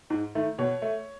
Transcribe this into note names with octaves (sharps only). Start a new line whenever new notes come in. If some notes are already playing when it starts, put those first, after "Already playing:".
G#2
D#3 A3
B2 C#5
A3